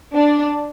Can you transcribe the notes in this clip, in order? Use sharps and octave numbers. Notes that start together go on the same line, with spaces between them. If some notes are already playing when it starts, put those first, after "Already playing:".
D4